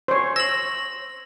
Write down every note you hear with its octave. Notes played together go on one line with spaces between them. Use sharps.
C5 C#5
E6 A#6 F#7